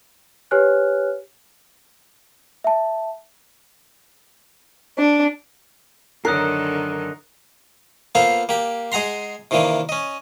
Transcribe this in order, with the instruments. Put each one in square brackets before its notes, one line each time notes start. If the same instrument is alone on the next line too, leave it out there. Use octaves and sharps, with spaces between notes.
[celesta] G4 B4 C#5 G#5 F6 F#6
E5 A5
[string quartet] D4
[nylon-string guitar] F#2 [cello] D3 D#3 [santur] A#4 [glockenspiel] D#6 F#6 C7
[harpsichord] A#3 B3 F4 A4 C5 F5
A#3 G4
G#3 G#4 F#5 A#5 C6
C3 D#3 E3 A#3 D4
C#4 D#5